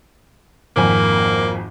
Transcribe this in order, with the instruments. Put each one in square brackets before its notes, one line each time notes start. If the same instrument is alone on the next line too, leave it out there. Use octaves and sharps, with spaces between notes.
[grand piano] G#1 F2 G#5 [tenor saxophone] A#3